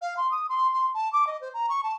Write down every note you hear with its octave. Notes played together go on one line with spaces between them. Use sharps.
F5
C6
D#6
C6
C6
A5
D6
D#5
C5
A#5
C#6
A5